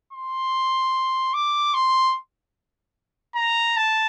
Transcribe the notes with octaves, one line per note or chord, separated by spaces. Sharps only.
C6
D6
C6
A#5
A5